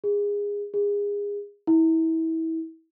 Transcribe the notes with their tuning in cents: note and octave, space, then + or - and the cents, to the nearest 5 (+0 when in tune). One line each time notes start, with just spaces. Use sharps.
G#4 -25
G#4 -30
E4 -30